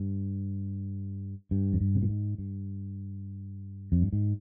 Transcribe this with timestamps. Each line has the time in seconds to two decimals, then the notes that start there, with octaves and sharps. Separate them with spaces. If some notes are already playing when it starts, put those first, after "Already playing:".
Already playing: G2
1.51 G2
1.73 F2
1.81 G2
1.95 C3
2.02 A#2
2.09 G#2
2.38 G2
3.92 F2
4.02 G2
4.13 G#2